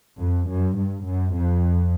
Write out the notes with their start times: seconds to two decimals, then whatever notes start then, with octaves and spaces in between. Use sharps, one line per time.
0.20 F2
0.49 F#2
0.77 G2
1.06 F#2
1.34 F2